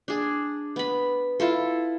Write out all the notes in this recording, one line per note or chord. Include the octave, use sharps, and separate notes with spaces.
D4 G#4
B3 B5
E4 F4 A4